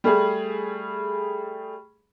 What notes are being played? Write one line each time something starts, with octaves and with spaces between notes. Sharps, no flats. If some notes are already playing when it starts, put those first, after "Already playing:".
G3 A3 G#4